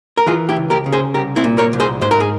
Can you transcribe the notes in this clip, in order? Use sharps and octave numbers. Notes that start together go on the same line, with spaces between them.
A#4
E3 F4 G#4
E4 G4
C#2
G4 A#4
C#3
G#4 C5
C2 G4 A#4
C4 E4
A#2
A#4 C#5
C2
G#4 C5
G#2 C5
A#4
G#4